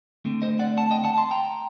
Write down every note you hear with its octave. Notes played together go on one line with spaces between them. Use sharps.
D3 A3 C4
C5 D#5
D5 F#5
F#5 A5
D#5 G5
F#5 A5
A5 C6
G5 A#5